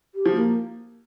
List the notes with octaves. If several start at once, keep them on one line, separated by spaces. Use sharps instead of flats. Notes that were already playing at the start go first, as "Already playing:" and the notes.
G4
F3
A#3